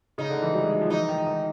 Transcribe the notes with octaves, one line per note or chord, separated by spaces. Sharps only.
C#3 D#4
D3
E3
G3
G#3
F#3
F3
E3 D#4
D#3
D#3